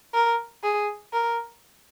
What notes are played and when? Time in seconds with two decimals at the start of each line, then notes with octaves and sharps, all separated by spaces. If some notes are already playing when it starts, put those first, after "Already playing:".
0.14 A#4
0.63 G#4
1.13 A#4